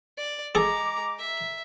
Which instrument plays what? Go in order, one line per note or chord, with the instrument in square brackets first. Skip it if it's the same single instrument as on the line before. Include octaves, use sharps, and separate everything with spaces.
[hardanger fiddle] D5
[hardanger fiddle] G#3 A#5 [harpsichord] G#4 A4 [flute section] D6
[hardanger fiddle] E5